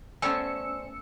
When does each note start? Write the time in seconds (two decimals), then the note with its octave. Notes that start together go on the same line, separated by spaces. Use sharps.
0.22 A3 B3 C#4 C5 D5 G#5 E6 C#7